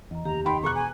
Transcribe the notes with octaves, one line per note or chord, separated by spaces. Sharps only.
E2 D#5 A#5
F1 D#2 G4 A#5
D#4 G5 B5 C6
E1 G#4 A#5 C#6 D6 F#6
G#5